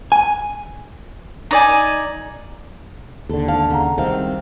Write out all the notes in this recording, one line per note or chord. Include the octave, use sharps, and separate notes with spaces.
G#5
D#4 D5 G#5
D#2 D3 A4
F5 A5
C#3 G#4 F#5 A#5
C2 C3 D#3 C4 F5